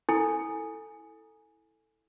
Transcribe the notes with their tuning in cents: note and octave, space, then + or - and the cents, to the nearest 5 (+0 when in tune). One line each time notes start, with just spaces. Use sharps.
E4 -15 A4 +0 G#5 +0